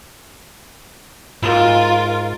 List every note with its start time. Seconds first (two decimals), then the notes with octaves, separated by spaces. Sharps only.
1.42 G#2 F4 A#4